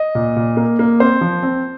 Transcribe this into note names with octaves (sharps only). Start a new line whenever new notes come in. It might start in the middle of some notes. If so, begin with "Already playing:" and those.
Already playing: D#5
A#2
A#2
A#3
A#3
C4 C5
F3
C4